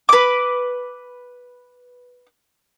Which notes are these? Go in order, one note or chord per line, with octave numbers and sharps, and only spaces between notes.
B4 D6